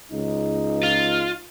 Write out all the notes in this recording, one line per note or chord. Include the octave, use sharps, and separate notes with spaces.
C#2 D#4
F4